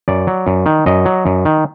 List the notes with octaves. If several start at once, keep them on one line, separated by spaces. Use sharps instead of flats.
F#2 D5
F#3
F#2
D#3
F#2 D#5
F#3
F#2
D#3